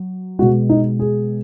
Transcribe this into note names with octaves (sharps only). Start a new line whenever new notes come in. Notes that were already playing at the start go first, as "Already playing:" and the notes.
Already playing: F#3
B2 G#3 F#4
D#4
G#4